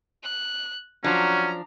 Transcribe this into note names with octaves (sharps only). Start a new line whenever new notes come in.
F#6
F3 F#3 C#4 D4 A#5